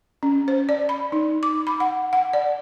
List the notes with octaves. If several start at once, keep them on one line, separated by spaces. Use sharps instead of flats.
C#4
C5
D5
B5
D#4
D6
B5
F#5
F#5
D5